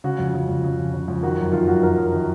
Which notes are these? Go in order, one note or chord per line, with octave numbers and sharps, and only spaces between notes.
C#3 F#4
F2
C#3
F2
C#3
F2
C#3
F2
D#3 F#4
F#2
D#3 F4
F#2 F#4
D#3 A#4
F#2
D#3